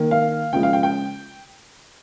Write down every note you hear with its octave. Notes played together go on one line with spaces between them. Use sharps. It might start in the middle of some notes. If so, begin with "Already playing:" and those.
Already playing: D#3 A#3
F5
C#3 F3 G#3 G5
F5
G5
G5